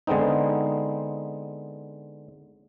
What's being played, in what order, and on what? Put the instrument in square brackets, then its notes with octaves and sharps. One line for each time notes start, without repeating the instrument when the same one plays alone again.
[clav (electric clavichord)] D3 G#3 B3 C4 D#4